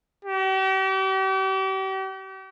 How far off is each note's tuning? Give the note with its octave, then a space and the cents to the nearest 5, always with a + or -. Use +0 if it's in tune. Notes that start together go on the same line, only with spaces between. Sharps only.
G4 -40